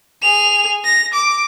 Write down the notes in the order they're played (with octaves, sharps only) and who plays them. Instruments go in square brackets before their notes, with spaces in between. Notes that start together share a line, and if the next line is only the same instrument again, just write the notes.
[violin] G#4 F7
A#6
D6